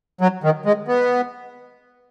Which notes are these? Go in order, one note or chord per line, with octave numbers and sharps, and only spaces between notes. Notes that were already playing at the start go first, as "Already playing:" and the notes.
F#3
D#3
G#3
B3